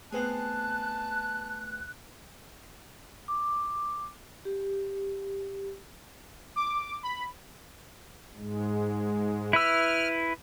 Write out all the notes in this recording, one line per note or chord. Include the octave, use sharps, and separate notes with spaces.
A3 B3 C4 G#4 B4 G#5 A5 F#6
D6
G4
D6
B5
G#2 G#3
E4 B4 E6 F6